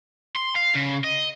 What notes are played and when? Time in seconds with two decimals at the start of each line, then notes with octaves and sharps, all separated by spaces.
0.36 C6
0.56 F5
0.75 C#3
1.04 D#5